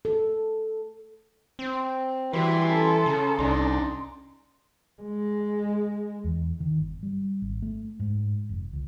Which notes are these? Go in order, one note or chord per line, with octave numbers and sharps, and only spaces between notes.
A4
C4
E3 G3 E4 F#4 G4 B4 G5 C6
C#4 A4 A#5 C6
C#3
C2 D4 D#4
G#3
E2
D#3
G1
G3
G#1
A3
G#2
F1
C#2